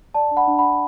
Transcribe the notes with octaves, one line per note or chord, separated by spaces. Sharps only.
D5 A5
D4
F#5 B5
D4
F#5 B5
D4